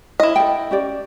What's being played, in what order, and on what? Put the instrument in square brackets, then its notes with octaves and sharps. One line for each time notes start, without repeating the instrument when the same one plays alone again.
[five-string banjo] E4 D#5
[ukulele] A4 G5
C#4 G4 D5